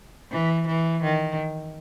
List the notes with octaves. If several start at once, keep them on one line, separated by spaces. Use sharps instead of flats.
E3
E3
D#3